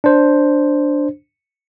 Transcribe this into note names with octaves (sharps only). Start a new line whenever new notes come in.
D4 C5